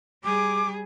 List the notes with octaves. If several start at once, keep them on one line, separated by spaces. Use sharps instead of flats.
G3 G#4 D6